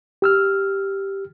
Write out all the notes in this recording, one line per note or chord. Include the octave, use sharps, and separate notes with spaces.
G4 E6 F6